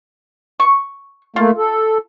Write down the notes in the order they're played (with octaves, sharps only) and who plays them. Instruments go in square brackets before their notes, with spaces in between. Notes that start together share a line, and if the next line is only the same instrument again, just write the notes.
[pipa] C#6
[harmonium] A3 A#3 [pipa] F4
[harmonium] A4